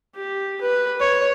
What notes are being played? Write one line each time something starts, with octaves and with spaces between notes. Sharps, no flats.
G4
B4
C#5